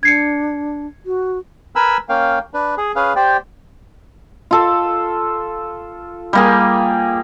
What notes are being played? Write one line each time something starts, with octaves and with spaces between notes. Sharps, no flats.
D4 G#6 C7 C#7
F#4
A#4 B4 G#5 B5 E6
A#3 C#4 F5 G5
D4 B4
G#4
C#4 G#4 B4 F5
G4 C5 D5 G5
F4 A4
G3 A#3 G#4